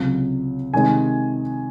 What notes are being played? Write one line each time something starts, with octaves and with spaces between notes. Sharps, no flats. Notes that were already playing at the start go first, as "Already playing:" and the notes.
Already playing: C#2 C3 F#3
C3 D#3 G#3 G#5